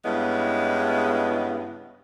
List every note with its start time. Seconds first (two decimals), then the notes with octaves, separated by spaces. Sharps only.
0.04 G2 C#3 G#3 B3 E4